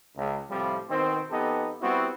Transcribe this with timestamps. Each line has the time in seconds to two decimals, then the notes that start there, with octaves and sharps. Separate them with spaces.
0.17 C#2
0.51 A2 C3 F3 G3
0.90 B2 D#3 C4
1.31 F2 B3 D#4 G4 A4
1.81 G3 B3 C4 E4 F#4